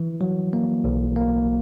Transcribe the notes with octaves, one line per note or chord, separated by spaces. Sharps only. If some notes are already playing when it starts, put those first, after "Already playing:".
Already playing: E3
F#3
A#3
B1
A#3